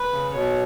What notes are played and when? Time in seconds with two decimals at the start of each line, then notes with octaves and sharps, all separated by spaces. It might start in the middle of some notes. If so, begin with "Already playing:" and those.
Already playing: B4
0.11 C#3
0.33 B2 C#5